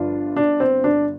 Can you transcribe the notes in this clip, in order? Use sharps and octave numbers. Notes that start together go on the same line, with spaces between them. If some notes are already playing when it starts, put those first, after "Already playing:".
Already playing: G1 G2 F3 D4 F4
D4
C4
D4